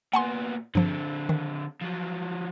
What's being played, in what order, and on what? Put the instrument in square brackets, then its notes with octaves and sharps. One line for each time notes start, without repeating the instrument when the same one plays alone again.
[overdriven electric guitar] A#2 B3 [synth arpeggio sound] F#5 G#5 C6
[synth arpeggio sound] G2 F3 [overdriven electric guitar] D3 C4
[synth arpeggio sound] D#3
[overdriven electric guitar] F3 F#3